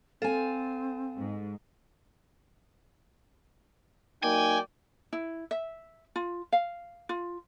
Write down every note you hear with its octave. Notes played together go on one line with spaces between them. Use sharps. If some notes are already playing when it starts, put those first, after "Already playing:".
C4 A4 F5 G#5
G#2
F#3 A#3 D#4 D5 G5 G#5
E4
E5
F4
F5
F4